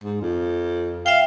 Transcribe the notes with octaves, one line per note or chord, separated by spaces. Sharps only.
G#2
F2
E5 F5 G5